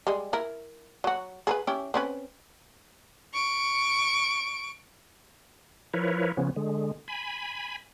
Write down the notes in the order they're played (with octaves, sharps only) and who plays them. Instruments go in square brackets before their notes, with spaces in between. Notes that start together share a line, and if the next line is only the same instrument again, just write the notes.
[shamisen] G3 G#3
E4 A#4
F#3 F#4
G#4 A#4 B4
C#4 E4 G4
C4 C#4 B4
[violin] C#6 D7
[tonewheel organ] F3 E4 A#4 B4 C#5
C#3 F3 B3 C#4
D3 G#3
G#5 B5